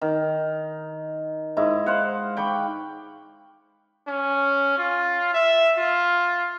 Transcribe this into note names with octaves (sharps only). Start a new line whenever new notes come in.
D#3
G#2 E4 D#5
C5 F5 F#5
G5 B5 C#6 D6
C#4
F4
E5
F4